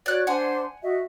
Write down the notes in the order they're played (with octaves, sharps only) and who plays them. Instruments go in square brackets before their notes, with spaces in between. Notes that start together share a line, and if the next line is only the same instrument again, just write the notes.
[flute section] F#4 C#5 [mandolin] D5 F#6
[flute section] D4 C5 C6 [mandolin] F#5 G#5
[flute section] F#4 D#5 E5